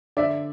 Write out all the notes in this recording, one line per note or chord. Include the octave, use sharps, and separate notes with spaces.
D3 D5 E5